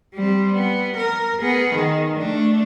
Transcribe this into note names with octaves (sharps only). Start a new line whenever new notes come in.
G3 C4
B3
A#4
B3 G#4
D#3
A3 D4